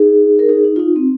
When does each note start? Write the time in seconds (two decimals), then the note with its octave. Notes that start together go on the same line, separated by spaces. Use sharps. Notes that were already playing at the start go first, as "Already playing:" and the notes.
Already playing: D#4 G#4
0.39 A#4
0.49 D#4 G#4
0.64 D#4
0.76 F4
0.79 D#4
0.96 C4